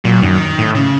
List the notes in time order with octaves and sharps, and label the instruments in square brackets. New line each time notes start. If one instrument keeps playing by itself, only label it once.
[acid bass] A#2 [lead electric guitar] F#3
[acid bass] F#2 [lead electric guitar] D#3
[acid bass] A2
[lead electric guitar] C#3